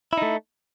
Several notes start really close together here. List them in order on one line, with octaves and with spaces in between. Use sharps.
E4 D#4 A3